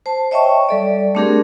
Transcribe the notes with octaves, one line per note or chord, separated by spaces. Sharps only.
C5 A5
C#5 D#5 E5 G5 A5 C#6
G3 A4 D5
A3 C4 D4 G4 G#4 A#4